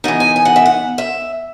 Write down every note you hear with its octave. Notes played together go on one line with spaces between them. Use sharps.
E3 B3 D#4
G#5
G#5
F#5
E5
F#5
E5